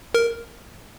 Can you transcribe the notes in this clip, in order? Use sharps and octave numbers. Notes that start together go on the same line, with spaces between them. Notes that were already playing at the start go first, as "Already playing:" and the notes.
A#4